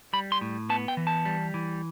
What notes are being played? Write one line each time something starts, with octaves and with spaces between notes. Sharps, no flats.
G3 B5
C6
A2
B3 A5
G5
E3
A5
G3
E3